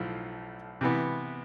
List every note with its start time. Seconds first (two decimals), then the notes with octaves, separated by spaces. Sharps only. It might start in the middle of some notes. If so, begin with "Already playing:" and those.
Already playing: B1 A2 F3
0.81 C3 E3 B3